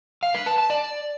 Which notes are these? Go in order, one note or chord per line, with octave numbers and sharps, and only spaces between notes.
F5
B4
A5
A5
D5